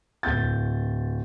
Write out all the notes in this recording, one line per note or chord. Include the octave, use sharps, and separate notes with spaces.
D1 G6 A6